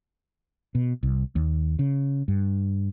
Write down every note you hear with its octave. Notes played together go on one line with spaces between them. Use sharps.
B2
C2
D#2
C#3
G2